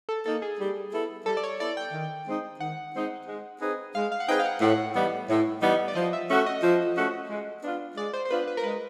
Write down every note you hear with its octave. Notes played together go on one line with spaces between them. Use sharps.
A4
A#3 D#4 A4
G#4
G3
B3 E4 A4
G3 A4
D5
C#5
B3 E4 A4 D5
G5
D#3
G#3 C4 D#4
D#3 F#5
G#3 C4 D#4
G#3
C4 D#4 G#4 B4
G#3 F5
F5
F#5
C4 D#4 G#4 B4 G5
F5
F#5
A2 F#5
E3 G3 B3 D#4
A2
E3 G3 B3 D#4
D5
F3 D#5
E5
A3 C#4 F#4 A4 E5
D#5
F3
A3 C#4 F#4 A4
G#3
B3 D4 F4
G#3 D5
C5
C5
B3 D4 F4 B4
B4
A#4
G#3 B4